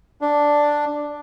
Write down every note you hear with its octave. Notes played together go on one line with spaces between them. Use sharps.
D4